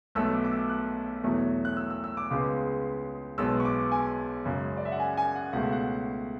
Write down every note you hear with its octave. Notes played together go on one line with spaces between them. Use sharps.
B1 B2 A3 E6
D6
D6
E6
F#6
E2 B2 F#3 A3
F#6
E6
E6
E6
D6
C#2 C#3 G#3 B3
B1 B2 G#3 B3 E6
C#6
D6
G#5
F#2 C#3 G#3
D5
E5
F#5
G#5
G#5
F#5
C#2 B2 A3 F#5
E5
F#5